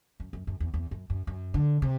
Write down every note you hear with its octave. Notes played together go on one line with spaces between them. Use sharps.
F#2
F#2
F#2
E2
E2
F#2
F#2
F#2
D3
C3